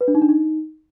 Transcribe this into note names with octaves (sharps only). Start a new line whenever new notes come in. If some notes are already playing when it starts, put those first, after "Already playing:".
B4
D4
D#4
D4
D#4